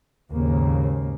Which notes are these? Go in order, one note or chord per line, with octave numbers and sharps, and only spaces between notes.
D#2 G#2 C#3 A#3